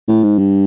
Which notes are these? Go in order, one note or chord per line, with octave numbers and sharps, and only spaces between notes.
A2
G#2
G2